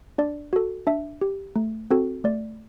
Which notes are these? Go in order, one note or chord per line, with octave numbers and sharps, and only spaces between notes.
D4 D5
F#4 A4
D4 E5
G4
A3
C4 F#4 A4
A3 D5